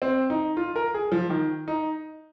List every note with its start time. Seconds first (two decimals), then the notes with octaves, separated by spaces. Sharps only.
0.02 C4
0.30 D#4
0.57 F4
0.76 A#4
0.94 G#4
1.12 F3
1.30 D#3
1.68 D#4